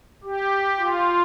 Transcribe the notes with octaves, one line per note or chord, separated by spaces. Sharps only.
G4
F4